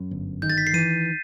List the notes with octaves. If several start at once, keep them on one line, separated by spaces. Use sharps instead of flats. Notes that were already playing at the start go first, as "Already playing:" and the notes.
Already playing: F#2
G1
D#3 G6
A6
B6
C7
E3 D#7